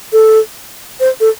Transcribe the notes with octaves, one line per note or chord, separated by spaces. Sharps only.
A4
C5
A4